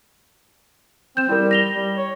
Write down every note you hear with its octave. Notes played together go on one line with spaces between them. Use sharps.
C4 G6 E7
G3 E4 A#4
A#6 F7 G7
G3
C#5